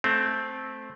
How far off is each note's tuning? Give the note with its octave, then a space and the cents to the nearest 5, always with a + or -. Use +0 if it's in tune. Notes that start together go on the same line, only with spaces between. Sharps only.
A3 -15 C4 +0